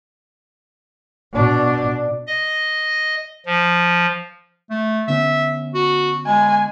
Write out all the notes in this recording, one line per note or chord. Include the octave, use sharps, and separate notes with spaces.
B2 D4
D#5
F3
A3
D3 B3 C#4 E5
F#4
G#3 G#5